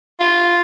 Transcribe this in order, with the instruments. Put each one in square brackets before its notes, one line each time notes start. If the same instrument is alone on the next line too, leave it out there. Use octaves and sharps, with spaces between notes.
[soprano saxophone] F4